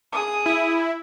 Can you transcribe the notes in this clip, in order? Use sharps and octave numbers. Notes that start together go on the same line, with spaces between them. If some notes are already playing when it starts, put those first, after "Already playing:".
G#4 D#6
E4